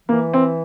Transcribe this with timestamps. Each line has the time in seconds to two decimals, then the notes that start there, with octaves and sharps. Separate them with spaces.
0.08 E3 A#3
0.34 C4